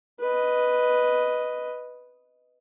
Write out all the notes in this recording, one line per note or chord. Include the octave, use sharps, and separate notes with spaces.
B4 D#5